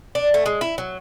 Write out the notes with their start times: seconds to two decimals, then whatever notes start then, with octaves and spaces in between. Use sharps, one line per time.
0.15 D4
0.34 A3
0.46 G#3
0.61 E4
0.78 F#3